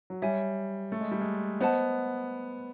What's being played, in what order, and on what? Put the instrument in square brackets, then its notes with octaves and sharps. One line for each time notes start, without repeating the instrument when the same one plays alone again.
[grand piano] F#3
[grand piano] G3 [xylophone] C#5 E5 G#5
[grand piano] A3
G#3
G3
G#3
[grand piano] B3 [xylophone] C5 D#5 F#5 A5